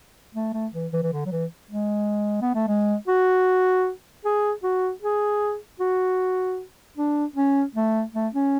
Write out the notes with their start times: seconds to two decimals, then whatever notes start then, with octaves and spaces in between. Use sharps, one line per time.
0.35 A3
0.53 A3
0.74 E3
0.93 E3
1.03 E3
1.13 D3
1.26 F#3
1.32 E3
1.71 G#3
2.42 B3
2.55 A3
2.68 G#3
3.08 F#4
4.25 G#4
4.63 F#4
5.02 G#4
5.80 F#4
6.97 D4
7.36 C#4
7.75 A3
8.14 A3
8.34 C#4